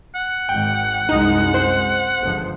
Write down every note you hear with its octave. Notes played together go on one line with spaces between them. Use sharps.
F#5
G#1 G#2 G5
C2 F#2 G#3 D#4
C5
G1 C#2 F3